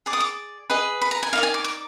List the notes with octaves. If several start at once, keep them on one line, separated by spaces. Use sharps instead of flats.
G#4 D5 D6
D#6
D6
G#4 B4 D#5
B5
A#5
G#5
D#4 A#4 D5 F5
G#5
D6
D6